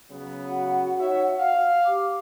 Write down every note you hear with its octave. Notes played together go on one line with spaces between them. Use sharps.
C#3 F#3 B3
F#4 F#5
D#4 C#5 E5
F5
G4 D6